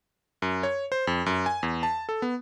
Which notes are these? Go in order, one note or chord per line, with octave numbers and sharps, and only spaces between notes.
F#2
C#5
C5
F2
F#2
G#5
E2
A5
A4
B3